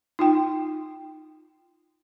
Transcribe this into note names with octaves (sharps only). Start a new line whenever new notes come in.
D#4 F4 G5